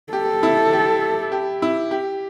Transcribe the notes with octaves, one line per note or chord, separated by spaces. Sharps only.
G4 A4
E4
G4
G4
E4
G4